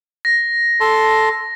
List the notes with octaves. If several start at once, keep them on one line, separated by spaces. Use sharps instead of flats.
A#6
A4 A5 C6